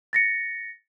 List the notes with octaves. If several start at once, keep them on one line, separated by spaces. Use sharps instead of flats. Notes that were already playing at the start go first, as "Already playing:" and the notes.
A6 A#6 C#7